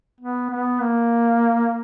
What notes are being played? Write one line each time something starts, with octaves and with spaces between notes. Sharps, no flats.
B3
B3
A#3